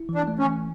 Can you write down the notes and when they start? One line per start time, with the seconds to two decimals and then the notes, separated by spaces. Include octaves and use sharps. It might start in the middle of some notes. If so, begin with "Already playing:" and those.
Already playing: E4
0.09 E3
0.15 D4
0.28 A3
0.39 C#4
0.46 E3